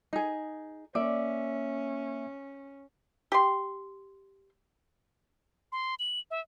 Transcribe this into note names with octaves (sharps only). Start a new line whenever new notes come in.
D#4 G#4
A#3 C#4 D5 E5
G4 C6
C6
F#7
E5